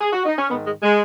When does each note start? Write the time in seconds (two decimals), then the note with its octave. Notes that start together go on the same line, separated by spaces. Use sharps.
0.00 G#4
0.13 F#4
0.25 D#4
0.37 C#4
0.49 G#2 D#3 B3
0.65 G#3
0.82 G#3